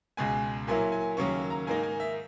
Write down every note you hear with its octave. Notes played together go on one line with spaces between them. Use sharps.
C#2 B2 G#3 G#5
A#2 F#3 A#3 E4 G#5
G#5
D#2 C#3 F#3 A#3 C#4 C#6
A#5
G#2 D#3 A#3 D#4 G#5
G#5
E5